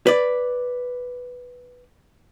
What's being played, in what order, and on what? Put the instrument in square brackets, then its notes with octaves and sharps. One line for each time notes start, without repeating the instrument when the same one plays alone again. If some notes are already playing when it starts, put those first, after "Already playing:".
[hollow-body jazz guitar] B4 D5